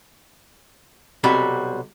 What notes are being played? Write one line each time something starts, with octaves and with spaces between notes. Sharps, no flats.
B1 C3 G3 F#4